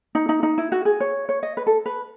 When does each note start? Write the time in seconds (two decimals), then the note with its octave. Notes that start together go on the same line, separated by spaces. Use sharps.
0.15 D#4
0.29 D#4
0.43 D#4
0.58 E4
0.72 F#4
0.85 G#4
1.00 C#5
1.29 C#5
1.43 D#5
1.57 B4
1.67 A4
1.86 B4